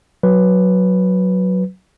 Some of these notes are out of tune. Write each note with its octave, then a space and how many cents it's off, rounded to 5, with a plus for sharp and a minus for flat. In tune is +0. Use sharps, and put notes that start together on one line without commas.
F#3 +0 B4 +0